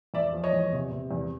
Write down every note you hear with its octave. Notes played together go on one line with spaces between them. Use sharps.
E2 D5 E5
F3
C#5 D#5
E2
C3
C3
E2